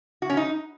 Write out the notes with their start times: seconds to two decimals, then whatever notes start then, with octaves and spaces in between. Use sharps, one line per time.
0.22 F#4
0.30 C#4
0.37 D#4